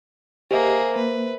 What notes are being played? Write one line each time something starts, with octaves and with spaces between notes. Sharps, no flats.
A#3 G4 G#4 C5 D#5 E5
A#3 B4